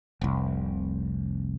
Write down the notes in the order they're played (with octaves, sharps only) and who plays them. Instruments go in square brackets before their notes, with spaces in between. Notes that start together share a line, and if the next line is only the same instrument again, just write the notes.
[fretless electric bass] F1 C2